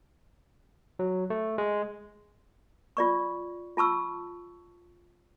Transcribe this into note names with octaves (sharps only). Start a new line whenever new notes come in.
F#3
A3
G#3
F4 D5 C#6
F4 A5 C#6 E6